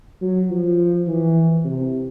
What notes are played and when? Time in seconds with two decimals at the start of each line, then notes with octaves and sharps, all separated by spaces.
0.21 F#3
0.50 F3
1.07 E3
1.65 C3